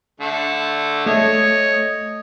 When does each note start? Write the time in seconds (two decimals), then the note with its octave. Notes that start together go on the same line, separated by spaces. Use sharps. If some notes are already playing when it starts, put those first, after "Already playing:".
0.20 D3 A3
1.06 A3 C#5 D#5